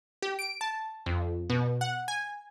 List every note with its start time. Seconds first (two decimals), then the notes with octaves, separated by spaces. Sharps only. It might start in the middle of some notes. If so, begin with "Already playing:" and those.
0.22 G4
0.39 D7
0.61 A5
1.06 F2
1.50 B2
1.81 F#5
2.08 G#5